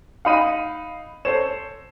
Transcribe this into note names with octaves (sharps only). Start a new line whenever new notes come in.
D#4 F5 F#5 B5 D#7
A4 C5 C#5 E7